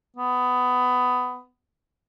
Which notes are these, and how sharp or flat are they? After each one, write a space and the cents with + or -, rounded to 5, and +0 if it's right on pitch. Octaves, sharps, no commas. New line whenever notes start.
B3 +15